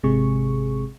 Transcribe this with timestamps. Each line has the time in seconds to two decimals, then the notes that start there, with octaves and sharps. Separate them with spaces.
0.03 G#1 C3 G#3 G#4 C#6